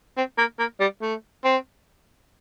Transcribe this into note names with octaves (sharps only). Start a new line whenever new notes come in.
C4
A#3
A#3
G3
A3
C4